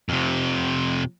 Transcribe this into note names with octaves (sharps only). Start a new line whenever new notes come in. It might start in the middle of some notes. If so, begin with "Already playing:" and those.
F2 C3